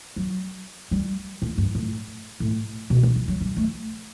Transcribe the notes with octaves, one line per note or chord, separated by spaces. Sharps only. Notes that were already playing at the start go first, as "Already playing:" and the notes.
F#3
G3
A2
G2
A2
A2
B2
D3
E3
F#3
G3
A3